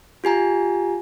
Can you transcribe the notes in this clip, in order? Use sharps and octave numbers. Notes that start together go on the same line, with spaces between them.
F4 G4 G#5 A#5